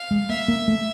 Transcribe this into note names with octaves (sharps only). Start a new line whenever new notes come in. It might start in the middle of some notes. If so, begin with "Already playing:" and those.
Already playing: F5
G#3
A#3 E5
A#3
A3